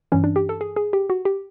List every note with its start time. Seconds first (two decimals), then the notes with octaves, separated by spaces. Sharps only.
0.12 G2 E3 C#4
0.24 D4
0.36 G4
0.49 A4
0.61 G#4
0.76 G#4
0.93 G4
1.10 F#4
1.25 G4